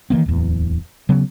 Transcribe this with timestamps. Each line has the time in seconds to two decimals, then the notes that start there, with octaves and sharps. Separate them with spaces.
0.10 D#3 E3 A#3 C4
0.26 D1 E2
1.09 C#3 F#3 B3